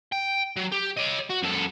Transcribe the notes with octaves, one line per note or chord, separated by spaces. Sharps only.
G5
F#3
G4
C#5 D#5
F#4
F#2 A4